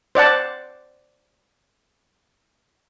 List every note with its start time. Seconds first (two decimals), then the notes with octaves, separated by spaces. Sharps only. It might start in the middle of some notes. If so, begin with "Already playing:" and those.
0.15 C5 D5 F#5 A5